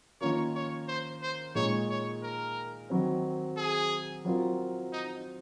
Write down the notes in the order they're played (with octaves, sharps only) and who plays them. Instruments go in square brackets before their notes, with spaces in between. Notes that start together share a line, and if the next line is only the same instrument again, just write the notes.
[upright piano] D#3 A#3 C#4 F4 A#4 [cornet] C#5
[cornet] C#5
C5
C5
[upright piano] A#2 G#3 D#4 [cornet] C#5
[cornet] C#5
A#4
[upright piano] D#3 F#3 C4
[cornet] G#4
[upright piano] F#3 C4 F4 A#4
[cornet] D#4